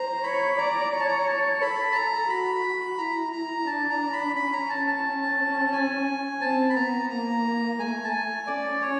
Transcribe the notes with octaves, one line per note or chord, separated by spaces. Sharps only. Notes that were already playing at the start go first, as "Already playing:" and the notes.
Already playing: C5 A#5
C#5 B5
D5 A#5
C#5 A#5
A5
A#5
A5
A4 B5
A5
A#5
F#4 B5
E4 A#5
A#5
D4 A5
A#5
B5
C#4 B5
A#5
A5
A5
C#4
G#5
C4 A5
B5
B3 A#5
A#3 A#5
A3 G#5
A5
G#5
C#4 D5
C#5